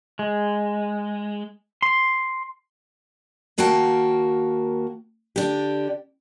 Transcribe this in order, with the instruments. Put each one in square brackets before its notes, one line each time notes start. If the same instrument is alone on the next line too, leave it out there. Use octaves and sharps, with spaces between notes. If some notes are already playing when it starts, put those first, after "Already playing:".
[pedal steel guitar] G#3
C6
[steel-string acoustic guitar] D#2 A#3 F#4 A#4 G5 A5
D3 D4 G4